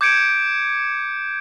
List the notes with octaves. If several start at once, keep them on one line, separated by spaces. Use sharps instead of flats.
D6 G6 G#6 C#7 D7